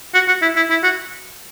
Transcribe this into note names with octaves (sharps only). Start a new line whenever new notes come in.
F#4
F#4
E4
E4
E4
F#4